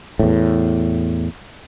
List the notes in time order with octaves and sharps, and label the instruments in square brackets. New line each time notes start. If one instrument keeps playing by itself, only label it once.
[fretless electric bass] E2 A2